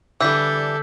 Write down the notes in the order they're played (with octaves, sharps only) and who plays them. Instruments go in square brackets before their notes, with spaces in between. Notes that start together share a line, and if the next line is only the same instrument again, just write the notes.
[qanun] D3 [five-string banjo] E3 G3 [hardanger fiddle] D4 A4 [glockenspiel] E6 G6 B6